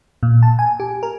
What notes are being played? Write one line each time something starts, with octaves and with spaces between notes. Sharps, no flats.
A#2
A5
G#5
G4
A#4